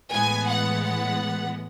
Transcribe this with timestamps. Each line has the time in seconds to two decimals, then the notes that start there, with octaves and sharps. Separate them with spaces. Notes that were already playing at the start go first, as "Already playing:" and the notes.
0.11 A2 E3 G#3 B3 G#5
0.47 F#5
0.82 F#5